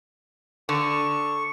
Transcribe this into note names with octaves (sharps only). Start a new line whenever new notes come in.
D3 C#6